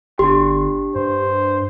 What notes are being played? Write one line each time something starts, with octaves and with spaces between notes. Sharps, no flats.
G1 D4 G4 C6
G2 C5